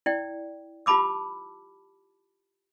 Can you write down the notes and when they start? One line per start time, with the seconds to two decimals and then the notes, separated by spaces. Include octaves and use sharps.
0.06 E4 D5 G5
0.86 F4 G4 A5 B5 D6 E6